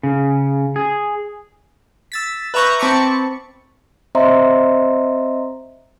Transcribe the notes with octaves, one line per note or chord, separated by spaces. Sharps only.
C#3
G#4
E6 A6 B6
B4 E5 A#5 C#6 G6 A#6
C4 A5 B5 C#6 D6 C#7
C4 C5 D#5 E5 A#5 C6